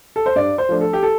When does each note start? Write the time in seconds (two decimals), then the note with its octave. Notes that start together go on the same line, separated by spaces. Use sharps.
0.16 A4
0.26 C5
0.36 G2 D5
0.58 C5
0.69 F3 A3 D4
0.81 A4
0.93 G4
1.03 A4